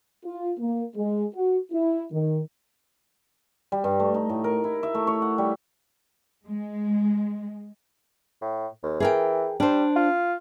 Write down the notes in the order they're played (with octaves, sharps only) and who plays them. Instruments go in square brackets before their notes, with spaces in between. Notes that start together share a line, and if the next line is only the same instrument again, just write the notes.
[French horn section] F4
A#3
G#3
F#4
E4
D#3
[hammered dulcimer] G3
G2
A3
D#4
A2
A#4
E4
E5
A3
C#5
F#5
G3
[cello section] G#3
[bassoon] A2
D#2
[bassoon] E3 [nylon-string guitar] G#4 A#4 G5
[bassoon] G3 [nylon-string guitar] D4 C5
[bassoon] F4